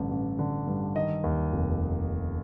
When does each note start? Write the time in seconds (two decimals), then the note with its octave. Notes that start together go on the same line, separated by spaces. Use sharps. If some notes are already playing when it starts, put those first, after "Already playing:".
Already playing: A1 G2 D3
0.11 A1
0.39 D3
0.67 G2
0.95 D#3 D#5
1.24 D#2
1.52 F1